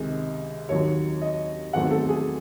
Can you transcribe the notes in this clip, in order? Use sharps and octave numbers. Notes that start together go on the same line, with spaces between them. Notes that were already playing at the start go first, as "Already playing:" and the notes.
Already playing: C#2 C3 D#3 G#3
D#2 D#3 F#3 C#5
D#5
E2 D#3 F#3 A3 C4 F#5
A4
G#4